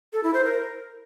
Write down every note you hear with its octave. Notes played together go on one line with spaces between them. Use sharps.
A4
E4
C5
A#4